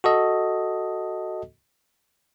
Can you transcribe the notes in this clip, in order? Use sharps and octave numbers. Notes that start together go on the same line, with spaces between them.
F#4 A4 D#5